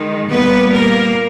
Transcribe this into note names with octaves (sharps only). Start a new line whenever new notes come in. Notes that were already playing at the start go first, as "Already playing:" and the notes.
Already playing: D#3 G#3
A#2 G3 A#3 B3 B4
A#3 A#4